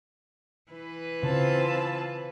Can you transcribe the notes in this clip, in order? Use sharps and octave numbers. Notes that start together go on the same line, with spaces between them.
E3 B4
C#3 C4 F4 A5